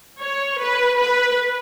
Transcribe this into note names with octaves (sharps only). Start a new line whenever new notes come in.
C#5
B4
B4